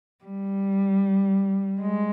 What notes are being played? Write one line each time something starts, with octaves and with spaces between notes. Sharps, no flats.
G3
G#3